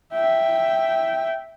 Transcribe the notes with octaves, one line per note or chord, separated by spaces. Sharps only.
E5 G5